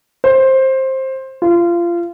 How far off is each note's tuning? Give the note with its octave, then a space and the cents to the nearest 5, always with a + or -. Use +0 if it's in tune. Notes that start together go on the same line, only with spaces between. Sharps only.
C5 +15
F4 -25